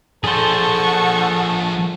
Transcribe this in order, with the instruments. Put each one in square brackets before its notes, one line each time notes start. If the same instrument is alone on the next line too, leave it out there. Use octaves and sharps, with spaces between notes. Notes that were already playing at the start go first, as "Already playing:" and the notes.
[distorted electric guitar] F3 D4 [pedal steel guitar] G#4 C5 [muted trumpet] A4 [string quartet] F#5 A5 C#6